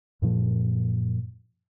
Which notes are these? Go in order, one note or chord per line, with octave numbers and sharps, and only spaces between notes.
F#2 A#2 F3